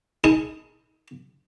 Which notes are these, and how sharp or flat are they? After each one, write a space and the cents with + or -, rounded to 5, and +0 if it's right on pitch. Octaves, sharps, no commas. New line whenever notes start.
D#4 +30 G#4 +0 A5 +0